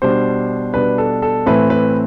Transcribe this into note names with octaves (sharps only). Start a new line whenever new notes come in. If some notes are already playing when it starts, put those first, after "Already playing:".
B2 G3 D4 C5
B2 G3 D4 B4
A4
A4
A2 E3 A3 C4 E4 B4
B4